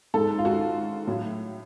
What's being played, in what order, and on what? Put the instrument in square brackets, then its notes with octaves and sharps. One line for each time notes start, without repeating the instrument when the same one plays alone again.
[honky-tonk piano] G#2 G#3 A4
F4
F#4
A2 F#3